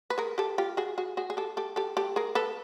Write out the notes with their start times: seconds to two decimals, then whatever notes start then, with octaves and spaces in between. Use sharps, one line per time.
0.10 B4
0.18 G#4 A#4
0.38 G4 A4
0.58 F4 G4
0.77 F#4 G#4
0.98 F#4 G#4
1.17 F#4 G#4
1.30 G#4
1.37 G4 A4
1.57 G4 A4
1.76 G4 A4
1.97 G4 A4
2.16 G#4 A#4
2.35 A4 B4